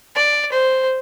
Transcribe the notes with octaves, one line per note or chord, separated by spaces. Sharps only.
D5
C5